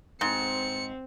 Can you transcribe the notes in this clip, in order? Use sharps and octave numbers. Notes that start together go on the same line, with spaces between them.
G#2 C4 C#7